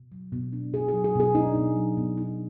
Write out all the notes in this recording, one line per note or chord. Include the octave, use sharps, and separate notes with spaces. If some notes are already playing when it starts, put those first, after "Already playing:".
Already playing: B2
F#3
B2
D4
B2 G#4
F#3 G#4
G#4
B2 G#4
D4 D#4
B2
F#3
B2
D#4